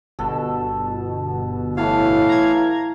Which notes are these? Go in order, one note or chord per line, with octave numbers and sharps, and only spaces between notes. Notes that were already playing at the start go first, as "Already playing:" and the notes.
G1 B2 A4
A2 E3 E4 C#5 F5 A5
A#5 G#6